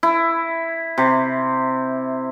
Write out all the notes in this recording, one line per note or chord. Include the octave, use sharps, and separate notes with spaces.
E4
C3